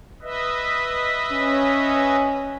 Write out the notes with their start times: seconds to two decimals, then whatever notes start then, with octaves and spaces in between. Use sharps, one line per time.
0.22 B4 D#5 E5
1.32 C#4